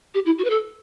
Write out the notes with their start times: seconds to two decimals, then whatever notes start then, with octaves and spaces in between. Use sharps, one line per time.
0.14 G4
0.26 E4
0.38 F#4
0.44 B4
0.50 A4